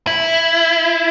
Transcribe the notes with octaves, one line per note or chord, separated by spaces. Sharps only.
E4